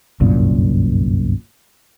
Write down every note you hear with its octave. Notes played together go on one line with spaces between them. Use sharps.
G1 C2 F#2 A#2